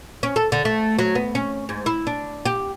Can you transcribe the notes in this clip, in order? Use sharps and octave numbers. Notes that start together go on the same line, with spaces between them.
C#4
A4
D3
A3
F#3
B3
C#4
G#2
E4
D4
G4